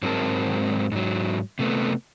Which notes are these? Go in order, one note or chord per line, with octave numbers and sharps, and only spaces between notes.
G#2 F#3 G#3 C4 A#4 A5
G#2 F#3
C3 A3 B3